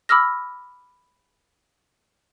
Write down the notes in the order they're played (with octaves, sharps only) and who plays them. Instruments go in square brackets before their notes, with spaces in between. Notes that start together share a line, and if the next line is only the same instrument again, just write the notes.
[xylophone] B5 D6 E6 F6 A#6